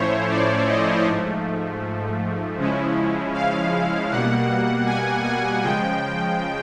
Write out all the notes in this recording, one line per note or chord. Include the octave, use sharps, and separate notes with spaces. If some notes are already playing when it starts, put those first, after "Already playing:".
Already playing: A2 F3 A3 C#4 E4 C5 C#5
D5
D#5
G#2 F3 A3
C#3 F3 G#3 C#4 E4
F5
B2 G3 A#3 F#5
G#5
G#5
C#3 F3 G#3 G5